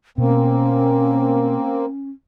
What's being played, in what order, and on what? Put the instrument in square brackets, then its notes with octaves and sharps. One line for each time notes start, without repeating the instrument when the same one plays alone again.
[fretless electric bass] B2 [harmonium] A#3 C4 [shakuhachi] C#4